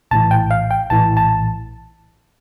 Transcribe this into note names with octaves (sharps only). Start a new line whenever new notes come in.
A#1 A2 E3 A5
G5
F5
G5
A#1 A2 E3 A5
A5